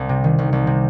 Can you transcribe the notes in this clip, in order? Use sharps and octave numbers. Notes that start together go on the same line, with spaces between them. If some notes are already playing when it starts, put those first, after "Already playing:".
Already playing: C2
C3
D#3
C2
C2
C3